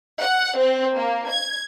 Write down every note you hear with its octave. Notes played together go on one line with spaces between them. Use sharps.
F#5
C4
A#3
G#6